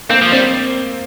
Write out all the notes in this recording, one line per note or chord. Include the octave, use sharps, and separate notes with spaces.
A#3 C4
F3
G3 C4